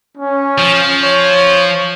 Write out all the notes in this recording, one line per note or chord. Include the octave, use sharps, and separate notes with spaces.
C#4
F3
C#5